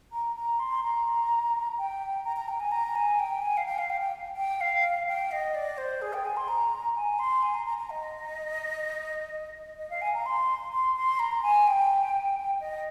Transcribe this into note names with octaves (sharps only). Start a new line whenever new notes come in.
A#5
A#5
C6
A#5
G5
A#5
A#5
G5
G#5
A#5
G#5
G5
G#5
F5
G5
F5
G5
G5
G5
F5
G5
D#5
D5
C5
G#4
G5
G#5
C6
A#5
G#5
C6
G#5
A#5
A#5
A#5
D#5
D#5
F5
G#5
A#5
C6
C6
C6
A#5
G#5
G5
D#5